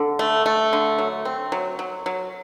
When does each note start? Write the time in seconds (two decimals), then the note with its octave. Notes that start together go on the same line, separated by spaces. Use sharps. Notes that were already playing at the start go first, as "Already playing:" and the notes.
Already playing: D3 A4
0.19 A3
0.46 A3
0.73 D3
0.99 F#3
1.25 C4
1.52 F#3
1.79 F#3
2.06 F#3